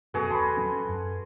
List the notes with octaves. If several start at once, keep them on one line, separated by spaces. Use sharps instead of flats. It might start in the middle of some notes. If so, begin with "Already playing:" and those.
F1 F#2 B2 F#4 G#4 A4 B4 G#5
D#2 A5 B5 C6
D#1 F#3 C#4
F#2